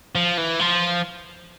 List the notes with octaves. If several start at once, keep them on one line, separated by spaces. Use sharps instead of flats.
F3
E3
F3